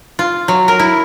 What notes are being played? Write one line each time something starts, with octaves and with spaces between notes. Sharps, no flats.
F4
F#3
A#4
E4